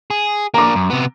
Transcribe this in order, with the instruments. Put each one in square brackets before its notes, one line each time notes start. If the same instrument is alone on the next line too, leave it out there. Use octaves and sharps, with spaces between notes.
[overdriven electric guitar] G#4
[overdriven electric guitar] A#3 D4 [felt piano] A#5 D6
[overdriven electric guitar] F#2
C3 B3